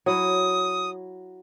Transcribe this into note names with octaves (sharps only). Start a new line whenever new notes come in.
F#3 E4 D#6